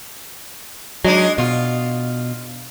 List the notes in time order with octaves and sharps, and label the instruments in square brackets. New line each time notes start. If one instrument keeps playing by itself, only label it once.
[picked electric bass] F#3 [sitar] G#3 D4 D#4
[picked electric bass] B2 [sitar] F4